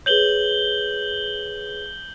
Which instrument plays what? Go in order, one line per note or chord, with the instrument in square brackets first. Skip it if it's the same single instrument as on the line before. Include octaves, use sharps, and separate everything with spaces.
[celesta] G#4 B4 C#5 [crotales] G6 F#7 G7